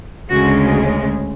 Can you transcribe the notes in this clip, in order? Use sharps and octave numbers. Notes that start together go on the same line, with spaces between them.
D2 C#3 G#3 F#4